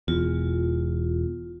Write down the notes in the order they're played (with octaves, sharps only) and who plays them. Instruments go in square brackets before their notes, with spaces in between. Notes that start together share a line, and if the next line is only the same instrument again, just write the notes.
[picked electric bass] E1 E2 [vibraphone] F4